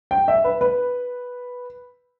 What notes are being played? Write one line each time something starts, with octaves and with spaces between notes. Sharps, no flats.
G5
E5
B4
B4